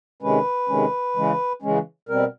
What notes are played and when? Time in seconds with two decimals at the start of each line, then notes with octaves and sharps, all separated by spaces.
0.22 C3 D#3 G#3 C#4 B4
0.69 C3 D#3 G#3 C#4
1.16 C#3 E3 G#3 C#4
1.62 C#3 E3 G#3 C#4
2.09 B2 G3 C4 A#4